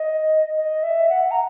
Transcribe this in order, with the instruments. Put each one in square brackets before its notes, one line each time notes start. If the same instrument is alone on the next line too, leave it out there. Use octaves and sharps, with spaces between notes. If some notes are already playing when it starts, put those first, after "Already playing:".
Already playing: [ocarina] D#5
D#5
E5
F#5
A#5